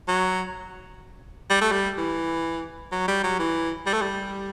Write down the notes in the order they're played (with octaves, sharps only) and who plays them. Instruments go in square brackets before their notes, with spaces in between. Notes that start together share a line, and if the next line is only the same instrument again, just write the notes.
[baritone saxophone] F#3
G3
A3
G3
E3
F#3
G3
F#3
E3
G3
A3
G3